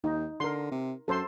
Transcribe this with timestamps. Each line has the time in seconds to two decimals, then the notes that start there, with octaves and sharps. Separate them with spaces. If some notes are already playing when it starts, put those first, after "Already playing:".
0.04 D#2 D#4
0.40 D3 A#4 C6
0.72 C3
1.08 F#2 A4 C5 C6